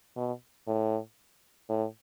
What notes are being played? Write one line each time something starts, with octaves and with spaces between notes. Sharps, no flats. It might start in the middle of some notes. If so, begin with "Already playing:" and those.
B2
A2
A2